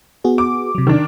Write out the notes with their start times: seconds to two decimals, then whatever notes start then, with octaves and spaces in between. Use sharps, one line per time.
0.24 B3 F#4 G#4
0.38 D6
0.75 C3 F#3
0.87 D#3 D4